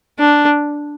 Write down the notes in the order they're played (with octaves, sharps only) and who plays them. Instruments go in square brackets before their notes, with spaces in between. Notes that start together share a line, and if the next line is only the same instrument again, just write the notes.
[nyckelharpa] D4